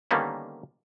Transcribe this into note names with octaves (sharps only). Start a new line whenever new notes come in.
D3 D#3 G3 A#3 B3 C#4